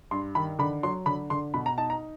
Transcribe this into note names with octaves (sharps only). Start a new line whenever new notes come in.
G2 C6
D#3 B5
D3 B5
F#3 C6
D3 B5
D3 C6
B2 B5
A#5
D#4 A5
A#5